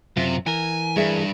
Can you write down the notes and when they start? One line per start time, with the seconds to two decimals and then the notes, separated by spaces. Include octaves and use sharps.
0.17 F#2 C3 F4
0.47 E3 A#4 G#5
0.96 G2 G#4 E5 G#5